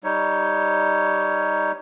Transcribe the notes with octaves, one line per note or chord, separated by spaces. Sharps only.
G3 D#4 C#5